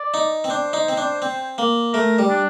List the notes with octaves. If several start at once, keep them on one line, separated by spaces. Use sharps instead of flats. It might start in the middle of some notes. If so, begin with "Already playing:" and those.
Already playing: D5
D#4
C4
D4 C5
D#4
C4
D4
C4
A#3
A3 A#4
G3
D4